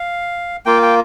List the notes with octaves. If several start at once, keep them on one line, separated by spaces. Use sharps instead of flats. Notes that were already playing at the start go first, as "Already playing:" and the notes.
Already playing: F5
A#3 F4 G5
G5